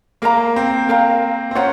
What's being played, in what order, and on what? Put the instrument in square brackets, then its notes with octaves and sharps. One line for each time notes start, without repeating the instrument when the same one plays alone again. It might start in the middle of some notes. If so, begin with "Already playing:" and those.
[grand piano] A#3 [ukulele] A#4 F5 A#5
[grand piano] C4
[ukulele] A#4 F5 A#5
[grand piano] C4
[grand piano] C#4 [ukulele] F4 C5 F#5 A#5